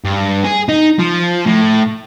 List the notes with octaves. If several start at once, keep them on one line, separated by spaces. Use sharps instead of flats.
G2
G#4
D#4
F3
A2